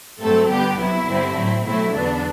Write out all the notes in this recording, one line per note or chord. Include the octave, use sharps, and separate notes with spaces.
G2 F#3 A3 C4 A4
G2 D3 G3 B3 G4
C2 C3 F#3 E4
G2 D3 G3 C4
A2 F#3 C4
B2 F#3 A3 C4 E4
E2 D3 F#3 B3 D4